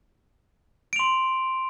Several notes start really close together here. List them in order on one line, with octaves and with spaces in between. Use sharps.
D7 F7 C6